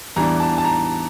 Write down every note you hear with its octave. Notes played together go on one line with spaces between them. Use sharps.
E2 E3 G3 D4 A#5
A5
A5
A#5